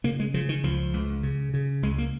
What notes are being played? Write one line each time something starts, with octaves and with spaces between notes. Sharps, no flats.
C#3 A#3
G#3
C#3 F3
D#3
C#2 F3
C#2
C#3
C#3
C#2 G#3
A#3